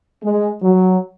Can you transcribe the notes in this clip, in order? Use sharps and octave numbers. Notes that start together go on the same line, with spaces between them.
G#3
F#3